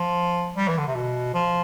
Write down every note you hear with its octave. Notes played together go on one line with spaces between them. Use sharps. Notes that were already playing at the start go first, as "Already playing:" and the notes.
Already playing: F3
G3
E3
D3
C3
B2
F3